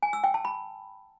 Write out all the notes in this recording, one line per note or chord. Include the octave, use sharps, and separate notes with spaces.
G#5
E6
G5
A5
B5